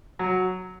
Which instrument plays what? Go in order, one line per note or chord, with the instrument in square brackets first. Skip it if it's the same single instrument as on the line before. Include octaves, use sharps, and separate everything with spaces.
[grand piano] F#3